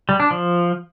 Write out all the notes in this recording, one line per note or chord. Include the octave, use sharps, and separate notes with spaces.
G3
D4
F3